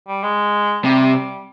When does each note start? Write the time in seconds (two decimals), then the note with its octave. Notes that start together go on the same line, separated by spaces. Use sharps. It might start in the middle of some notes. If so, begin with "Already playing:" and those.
0.08 G3
0.23 G#3
0.84 C3 G3